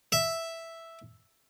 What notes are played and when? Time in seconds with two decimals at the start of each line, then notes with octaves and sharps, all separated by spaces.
0.12 E5